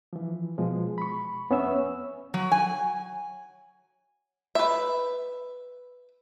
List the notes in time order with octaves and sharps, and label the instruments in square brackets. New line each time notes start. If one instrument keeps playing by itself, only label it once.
[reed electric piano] E3 F3
B2 F3 G#3
B5 C#6
F2 B3 C#4 C#5 E5 E6
[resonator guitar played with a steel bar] F#3
G#5
[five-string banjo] B4 E5